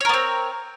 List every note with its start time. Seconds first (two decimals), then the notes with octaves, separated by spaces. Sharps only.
0.01 C#5
0.05 A#4
0.09 B3
0.14 C4